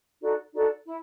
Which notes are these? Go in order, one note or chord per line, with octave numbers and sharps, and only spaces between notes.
D#4 F#4 A4 D5
D#4 F#4 A4 D5
E4